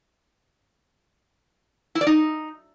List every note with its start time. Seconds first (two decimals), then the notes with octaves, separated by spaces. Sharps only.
1.95 E4
2.01 D5
2.07 D#4